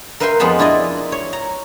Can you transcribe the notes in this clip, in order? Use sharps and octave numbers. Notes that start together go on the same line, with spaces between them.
A#4 B4 E5 F5 G5 C6
F2 G#3 B3 F4 A5 B5
D4 E4 F4 D5 D#5
C#5
A#5